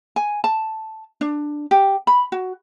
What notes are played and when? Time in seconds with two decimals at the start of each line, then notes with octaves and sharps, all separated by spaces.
0.16 G#5
0.44 A5
1.21 D4
1.71 G4
2.07 B5
2.32 F#4